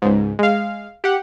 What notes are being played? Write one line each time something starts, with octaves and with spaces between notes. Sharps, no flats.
C#2 G#2
G#3 F5
G4 F#5